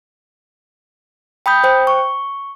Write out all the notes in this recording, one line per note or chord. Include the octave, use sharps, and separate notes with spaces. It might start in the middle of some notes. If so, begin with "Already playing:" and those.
G5 B5 D#6 G6
C5 G5
C#6